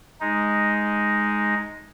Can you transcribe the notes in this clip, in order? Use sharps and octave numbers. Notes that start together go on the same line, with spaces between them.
G#3 D#4